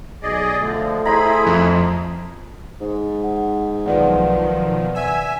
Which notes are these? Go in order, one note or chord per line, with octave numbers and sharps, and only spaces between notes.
B1 G#4 D5 D#5
D3 F3 A3
E4 G#4 C5 D#5 A#5 B5
F2
G#2
F#5
B1 D#3 F3 B4 D5 F#5
E5 G#5 E6